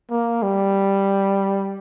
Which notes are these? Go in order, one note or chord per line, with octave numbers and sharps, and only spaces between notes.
A#3
G3